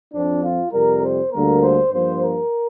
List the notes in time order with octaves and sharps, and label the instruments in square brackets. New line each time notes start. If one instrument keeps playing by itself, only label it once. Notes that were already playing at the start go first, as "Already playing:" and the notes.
[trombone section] F2 F3 C4 D4
F4
F2 C3 G3 A#4
C5
D2 D3 G3 A#3 A#4
C5
G2 F3 A#3 C5
A#4